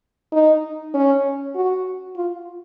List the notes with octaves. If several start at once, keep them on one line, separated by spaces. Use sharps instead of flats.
D#4
C#4
F#4
F4